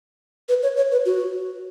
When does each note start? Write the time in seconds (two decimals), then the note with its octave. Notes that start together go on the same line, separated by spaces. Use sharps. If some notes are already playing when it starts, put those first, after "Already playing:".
0.49 B4
0.63 C#5
0.77 C#5
0.92 B4
1.06 F#4